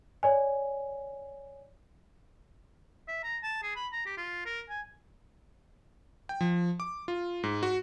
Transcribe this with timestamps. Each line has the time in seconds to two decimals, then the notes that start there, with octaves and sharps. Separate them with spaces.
0.23 C#5 D5 G#5
3.08 E5
3.24 A#5
3.43 A5
3.63 G#4
3.76 B5
3.93 A#5
4.06 G4
4.17 F4
4.46 A#4
4.69 G#5
6.29 G5
6.41 F3
6.80 D6
7.08 F4
7.43 G#2
7.63 F#4